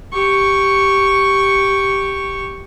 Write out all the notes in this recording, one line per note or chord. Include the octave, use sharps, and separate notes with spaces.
G4 C#6